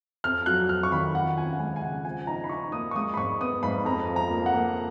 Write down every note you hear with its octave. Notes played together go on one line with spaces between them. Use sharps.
F2 F6
F#3 F#6
F2 F6
C#6
D#3 B5
F4 F#5
C#4 G#5
F#5
G#3 G#5
G#5
C#3 F#5
F3 G#5
D#4 A#5
B5
D#4 C#6
A#3 D#6
C#6
G#3 D#6
B5
G#2 C#6
B3 D#6
G#2 B5
F2 A#5
F3
A#5
A#3
F#5
A#3